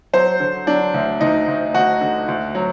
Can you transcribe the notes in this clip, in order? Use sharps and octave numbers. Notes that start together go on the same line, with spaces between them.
F#3 C5
D3
F#3 D4
D2
D2 D#4
D2
D2 F#4
D3
D2
F#3